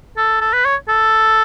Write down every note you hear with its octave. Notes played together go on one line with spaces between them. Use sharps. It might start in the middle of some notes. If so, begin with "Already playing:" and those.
A4
A4
B4
C#5
A4